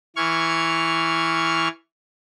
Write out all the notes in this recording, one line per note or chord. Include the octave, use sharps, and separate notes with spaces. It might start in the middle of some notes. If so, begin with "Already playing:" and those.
E3 C#6 F6 G#6